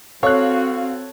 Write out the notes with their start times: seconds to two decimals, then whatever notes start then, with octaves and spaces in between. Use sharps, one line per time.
0.23 C4 F#4 A4 C#5 F5 C#6 F#6